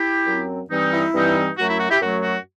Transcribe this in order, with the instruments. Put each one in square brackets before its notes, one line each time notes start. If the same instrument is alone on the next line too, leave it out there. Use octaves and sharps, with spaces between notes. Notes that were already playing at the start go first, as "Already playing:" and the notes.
Already playing: [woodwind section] E4 G4
F#2 F#3 C4
G2 E3 G3 C4 D#4
E4
G2 E3 G3 C4 D#4
F#2 F#3 A3 F#4
E4
F#4
E4 G4
F#2 F#3 A3 F#4
F#4